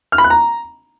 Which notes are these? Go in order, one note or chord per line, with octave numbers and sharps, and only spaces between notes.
F6
B5
F#6
A#5